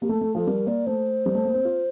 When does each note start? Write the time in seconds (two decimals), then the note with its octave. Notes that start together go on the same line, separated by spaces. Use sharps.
0.02 A#3 G4
0.09 A3 A4
0.21 A3
0.35 F3 A4
0.47 G3 A#4
0.67 A#3 D5
0.86 A3 C5
1.26 G3
1.35 A3
1.45 A#3
1.54 C4
1.65 F4